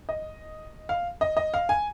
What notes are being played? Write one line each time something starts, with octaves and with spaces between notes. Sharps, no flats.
D#5
F5
D#5
D#5
F5
G#5